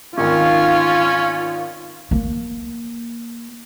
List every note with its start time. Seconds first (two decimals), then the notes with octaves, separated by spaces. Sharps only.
0.18 G#1 D#3 C#4 F4
2.11 A#3